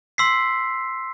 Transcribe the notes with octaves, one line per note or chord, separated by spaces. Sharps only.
C6 E6 B6 C7